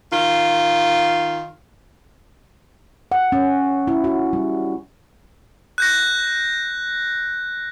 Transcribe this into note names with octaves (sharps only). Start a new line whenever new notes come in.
D#3 F4
F#5
C#4
E4
F#4
G3
F#6 G6 A#6